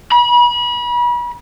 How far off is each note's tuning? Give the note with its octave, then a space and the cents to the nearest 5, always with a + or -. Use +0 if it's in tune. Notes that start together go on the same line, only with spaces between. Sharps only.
B5 -35